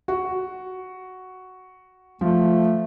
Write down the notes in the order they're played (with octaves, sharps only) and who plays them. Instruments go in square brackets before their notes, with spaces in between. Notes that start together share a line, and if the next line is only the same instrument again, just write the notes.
[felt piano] F#4
[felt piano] F3 [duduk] A3